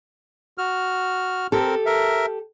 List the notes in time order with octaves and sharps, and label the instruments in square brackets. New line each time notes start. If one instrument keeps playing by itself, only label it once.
[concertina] F#4 F6
[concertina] C4 A#4 [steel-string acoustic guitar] G4 A4
[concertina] A#4 E5